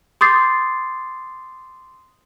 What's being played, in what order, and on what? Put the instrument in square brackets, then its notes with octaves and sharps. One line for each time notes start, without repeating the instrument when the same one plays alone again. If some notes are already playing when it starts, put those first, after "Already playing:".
[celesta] C6 D6 D#6 G6 A6 C7